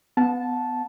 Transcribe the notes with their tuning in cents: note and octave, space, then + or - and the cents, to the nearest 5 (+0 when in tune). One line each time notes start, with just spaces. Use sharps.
B3 +15 F#5 -40 A5 -10